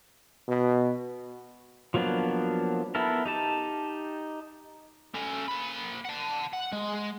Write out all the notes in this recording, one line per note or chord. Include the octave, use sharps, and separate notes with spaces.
B2
F3 F#3 A#3 B3 D4
B3 E4 A4 A#4
D#4 G4 A5
C#4 A4
A#3 B5
F#5 A5
F#5
G#3